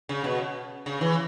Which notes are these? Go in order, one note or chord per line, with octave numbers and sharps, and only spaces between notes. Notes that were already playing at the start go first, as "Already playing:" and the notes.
C#3
B2
C#3
E3